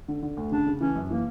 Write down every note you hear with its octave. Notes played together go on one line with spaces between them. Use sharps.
D3
D3
D2
C#3 D4
C#3
E3 C#4
F#2
E3 A#3